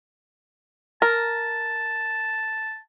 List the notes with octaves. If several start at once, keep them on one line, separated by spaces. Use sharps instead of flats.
A#4 A5